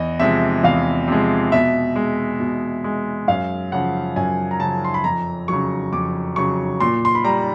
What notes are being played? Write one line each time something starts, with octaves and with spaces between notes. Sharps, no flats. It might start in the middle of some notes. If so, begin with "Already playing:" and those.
Already playing: E2 D#5
C3 F3 G#3 E5
E2 F5
C3 F3 G#3
B2 E5
G#3
B2
G#3
F#2 F5
C#3 F3 F#5
F#2 G#5
A#5
C#3 F3 A5
C6
B5
F2 A#5
C#3 F#3 C#6
F2 D6
C#3 F#3 C#6
A#2 C6
C6
B5
G3 A#5